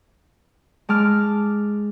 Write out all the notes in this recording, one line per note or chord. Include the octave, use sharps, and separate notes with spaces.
G#3 A5 D6 F6